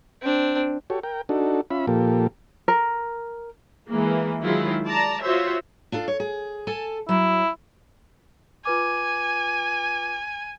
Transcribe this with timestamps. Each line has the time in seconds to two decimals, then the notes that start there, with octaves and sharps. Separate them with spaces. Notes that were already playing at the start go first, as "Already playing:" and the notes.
0.22 C4 D4
0.90 F#4 G4 A4 C#5
1.03 A#4 G5
1.29 D4 D#4 F#4 A4
1.71 C#4 F4 E5 B5
1.87 A#2 F3 A#3 G4 A4
2.68 A#4
3.89 E3 G#3 A#3
4.41 D#3 F#3 G#3 E4 F4
4.86 D5 A5 A#5
5.21 F4 F#4 C5 C#5 E5
5.92 D4 F4 A4
6.08 C#5
6.20 G#4
6.67 A4 G#5 A5
7.09 F#3 E4
8.65 F4 B4 G#5 D6